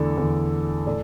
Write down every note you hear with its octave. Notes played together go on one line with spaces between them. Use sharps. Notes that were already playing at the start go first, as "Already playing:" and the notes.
Already playing: E2 D3 A3 A4 D5
E2 D3 A3
A2 A3 A4 D5